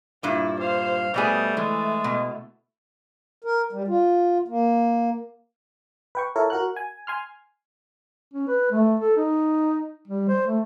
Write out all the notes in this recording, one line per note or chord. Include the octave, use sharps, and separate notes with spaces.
G2 A#2 E4
C5 F5
B2 G3 A3 B3 G#4
E3 G#3
B2
A#4
G3
F4
A#3
B4 G5 C#6
E4 A4 A#4 C#5
F#4 A#4 F#5 F#6
G#5
G#5 C6 F6
C#4
B4
A3
A4
D#4
G3
C5
A3